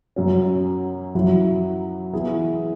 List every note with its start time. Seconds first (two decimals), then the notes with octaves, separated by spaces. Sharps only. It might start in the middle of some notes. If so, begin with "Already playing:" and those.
0.16 F#2 F#3 C#4
1.15 F#2 F#3 E4
2.13 E3 B3 E4 G#4